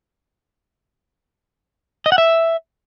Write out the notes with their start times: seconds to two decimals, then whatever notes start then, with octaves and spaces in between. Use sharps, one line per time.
2.06 D#5
2.12 F#5
2.18 E5